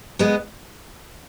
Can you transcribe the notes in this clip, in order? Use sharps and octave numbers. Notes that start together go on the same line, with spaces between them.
G#3 B3